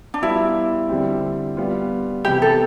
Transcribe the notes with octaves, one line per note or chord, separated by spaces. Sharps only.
D4
G3 B3 E4 F4
D3 G3 C4
G3 B3 F4
C3 E3 B3 E4 G4
A4